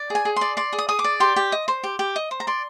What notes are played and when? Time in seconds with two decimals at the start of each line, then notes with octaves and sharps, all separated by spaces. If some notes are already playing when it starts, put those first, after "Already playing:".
Already playing: D5
0.10 G#4 G#5
0.25 G#4
0.36 D5 C6
0.57 D5 C6
0.73 G#4
0.79 D#6
0.89 G#4 D#6
0.99 D6
1.04 D5
1.20 G4 C6
1.36 G4
1.52 D#5
1.68 C5
1.84 G4
1.99 G4
2.16 D#5
2.31 C5
2.40 A#5
2.47 D5 C6